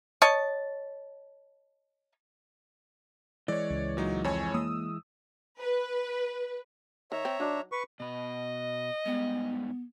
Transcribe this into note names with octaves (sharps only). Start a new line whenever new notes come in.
C#5 D#5 A5
E3 G#3 C#5 D5
C#2
A#2 F#3 D#4
F2 C#5 G#5
A#3 D#6 E6
B4
D#3 C#5 E5 A#5
C4
F#3 D4 D#4
B4 C#6
B2 B4 D#5
G#2 G3 B3